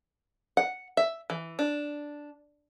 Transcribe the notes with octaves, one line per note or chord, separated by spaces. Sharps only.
F#5
E5
E3
D4